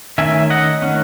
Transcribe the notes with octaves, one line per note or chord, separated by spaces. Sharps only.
D#3 A3 C#4 E5 G#5
D#5 F#5
D#3 A3 C#4